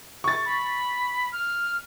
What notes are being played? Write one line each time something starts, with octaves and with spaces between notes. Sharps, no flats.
C#6 A6
B5
F6